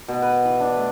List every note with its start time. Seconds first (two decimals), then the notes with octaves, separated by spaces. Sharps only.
0.08 B2
0.22 B4
0.45 E3
0.60 D4
0.76 A3